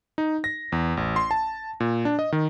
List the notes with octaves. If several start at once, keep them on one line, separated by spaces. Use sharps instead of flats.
D#4
A#6
E2
A1
C6
A5
A#2
D4
D#5
D#3